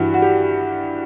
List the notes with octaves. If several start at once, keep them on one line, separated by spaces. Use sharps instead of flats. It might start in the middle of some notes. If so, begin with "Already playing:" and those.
Already playing: G2 E3 F#4
F#4
G4